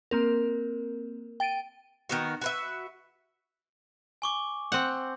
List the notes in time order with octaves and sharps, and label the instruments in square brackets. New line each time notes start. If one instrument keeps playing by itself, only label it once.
[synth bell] A#3 C4 A#4
G5 A6 D7 D#7
[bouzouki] D#3 B3 F#4
F#4 B4 E5
[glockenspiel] G#5 C#6 D6
[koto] C4 F#5 [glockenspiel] G6